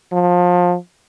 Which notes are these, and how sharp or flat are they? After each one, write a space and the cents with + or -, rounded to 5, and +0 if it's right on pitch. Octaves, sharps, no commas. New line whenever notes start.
F3 +25